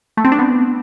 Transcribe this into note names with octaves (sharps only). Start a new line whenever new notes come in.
A3
C4
D4
B3